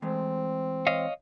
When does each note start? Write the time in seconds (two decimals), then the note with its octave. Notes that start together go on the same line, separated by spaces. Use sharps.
0.02 E3 G#3 A3 C4
0.87 C#5 D#5 F5